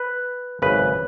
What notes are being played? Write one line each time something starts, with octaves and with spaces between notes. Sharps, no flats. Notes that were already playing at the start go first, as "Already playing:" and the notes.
Already playing: B4
G#1 F#2 C#3 B4